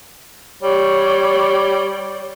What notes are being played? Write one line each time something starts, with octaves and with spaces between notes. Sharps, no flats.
G3 C#5